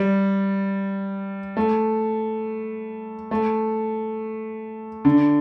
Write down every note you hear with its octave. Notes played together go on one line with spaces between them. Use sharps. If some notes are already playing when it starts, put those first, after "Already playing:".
Already playing: G3
A3
A3
D3